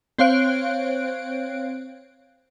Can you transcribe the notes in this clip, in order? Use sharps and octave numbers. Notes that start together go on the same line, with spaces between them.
C4 C5 C#5 F5 F#6 D7